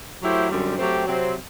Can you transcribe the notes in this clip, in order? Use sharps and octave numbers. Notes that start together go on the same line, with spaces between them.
F#3 A3 E4 G4 C5
F#2 D3 G3 C4
F#3 A3 C4 G4
C3 F#3 C4